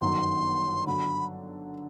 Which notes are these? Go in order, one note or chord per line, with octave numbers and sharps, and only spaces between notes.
G1 F#2 D#3 F#3 C6
D3 F#3 B5